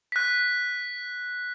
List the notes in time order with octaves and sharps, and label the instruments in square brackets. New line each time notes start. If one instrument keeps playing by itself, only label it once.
[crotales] F#6 B6